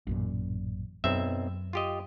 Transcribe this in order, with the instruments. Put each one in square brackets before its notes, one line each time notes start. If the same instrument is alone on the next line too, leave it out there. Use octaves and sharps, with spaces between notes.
[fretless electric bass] A1 F#2 A#2
[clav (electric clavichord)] B1 C4 E5 [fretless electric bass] F#2
[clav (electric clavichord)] F4 G4 D#5